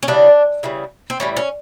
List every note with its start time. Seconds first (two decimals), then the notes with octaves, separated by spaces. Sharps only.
0.03 C#4
0.07 C#3 E3 G3 D4
0.63 C#3 E3 G3
1.10 C4
1.20 A2 E3 G3 C#4
1.37 C#4